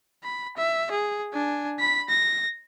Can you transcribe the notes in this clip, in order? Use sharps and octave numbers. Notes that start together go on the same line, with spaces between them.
B5
E5
G#4
D4 G#5
B5 B6
A#6